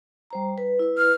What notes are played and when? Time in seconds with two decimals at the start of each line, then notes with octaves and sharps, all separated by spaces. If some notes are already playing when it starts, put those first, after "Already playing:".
0.31 G3 C5 A#5
0.58 B4
0.79 E4 B4
0.98 F6